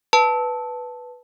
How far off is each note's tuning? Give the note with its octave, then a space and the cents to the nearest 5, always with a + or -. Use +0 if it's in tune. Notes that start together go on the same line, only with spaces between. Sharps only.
B4 +0 A5 +0